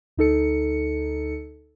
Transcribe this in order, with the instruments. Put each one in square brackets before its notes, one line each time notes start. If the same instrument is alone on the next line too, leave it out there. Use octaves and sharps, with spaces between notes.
[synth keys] D2 D#4 A4 C#7